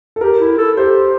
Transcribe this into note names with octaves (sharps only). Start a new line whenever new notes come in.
A4
G4 A#4
E4
A4
G4 C5